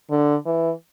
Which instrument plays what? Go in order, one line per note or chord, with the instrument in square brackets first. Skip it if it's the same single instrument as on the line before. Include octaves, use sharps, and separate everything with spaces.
[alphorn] D3
E3